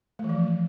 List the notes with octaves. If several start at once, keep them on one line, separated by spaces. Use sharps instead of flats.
A3
E3
F3